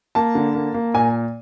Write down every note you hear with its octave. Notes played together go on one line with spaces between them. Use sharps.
A#3 A5
D3
A#3
A#3
A#2 G#5